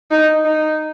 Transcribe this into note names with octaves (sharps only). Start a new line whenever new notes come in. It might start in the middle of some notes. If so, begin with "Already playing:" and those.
D#4
D#4